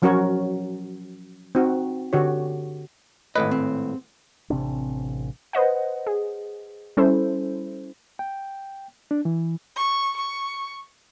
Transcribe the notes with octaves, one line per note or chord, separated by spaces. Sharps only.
F3 F#3 C#4 F#4 A#4 C#5
C4 D#4 F#4
D3 F#4 G4 C#5
G#1 A2 B4 D#5
C4
A1 C3 C4 D4
B4 C5 D#5 F#5
G#4
G3 C#4 E4 A4 C5
G5
D4
E3
C#6
C#6